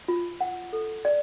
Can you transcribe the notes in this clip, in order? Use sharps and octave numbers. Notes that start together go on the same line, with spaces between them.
F4
F#5
A4
D5